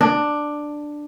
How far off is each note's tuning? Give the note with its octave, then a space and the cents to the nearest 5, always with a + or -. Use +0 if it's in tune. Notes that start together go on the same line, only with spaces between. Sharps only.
D4 +10